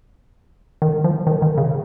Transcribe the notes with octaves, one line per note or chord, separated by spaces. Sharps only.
D#3
F3
D#3
D#3
C#3